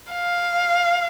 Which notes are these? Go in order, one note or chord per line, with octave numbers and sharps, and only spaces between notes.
F5